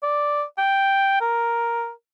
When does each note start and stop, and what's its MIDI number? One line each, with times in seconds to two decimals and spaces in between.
0.03 0.43 74
0.58 1.21 79
1.21 1.91 70